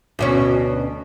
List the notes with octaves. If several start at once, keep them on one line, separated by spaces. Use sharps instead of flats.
D2 B2 C#4